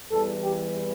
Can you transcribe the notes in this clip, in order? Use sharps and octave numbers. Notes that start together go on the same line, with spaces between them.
E2 E3 G3 A4
G4